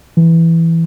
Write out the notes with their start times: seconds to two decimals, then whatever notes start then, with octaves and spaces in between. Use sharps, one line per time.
0.17 E3